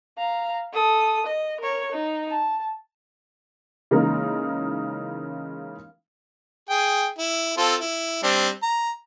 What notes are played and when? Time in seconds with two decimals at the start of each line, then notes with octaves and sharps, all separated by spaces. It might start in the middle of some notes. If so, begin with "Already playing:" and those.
0.18 F5 A#5
0.73 A4 D#6
1.26 D#5
1.61 A#4 C#5
1.92 D#4
2.30 A5
3.91 C#3 E3 G#3 A#3 D#4 A#4
6.70 G#4 G5
7.19 E4
7.58 C4 F4 A4
7.81 E4
8.23 G3 C4 D4
8.63 A#5